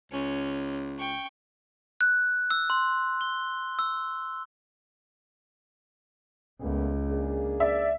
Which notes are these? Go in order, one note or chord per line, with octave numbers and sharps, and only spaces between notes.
C#2 C#4
G5 C#6
F#6
E6
C6
G7
E6
C#2 A#2 A3 B3
A#3 D4 G#4
D5 E5